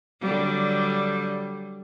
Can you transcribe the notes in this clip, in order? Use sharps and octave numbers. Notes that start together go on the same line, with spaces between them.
D3 F#3 G3